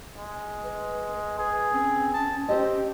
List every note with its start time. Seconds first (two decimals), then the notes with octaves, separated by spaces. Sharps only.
0.15 G#3
0.64 B4
1.39 G#4 B4
1.73 C4 C#4
2.14 A5
2.49 C4 G4 C5 D#5